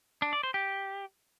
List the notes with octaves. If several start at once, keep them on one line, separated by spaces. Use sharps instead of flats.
D4
D5
C5
G4